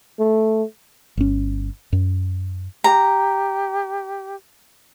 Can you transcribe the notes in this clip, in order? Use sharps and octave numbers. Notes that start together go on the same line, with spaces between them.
A3
G1 C#4
F#2
G4 A#5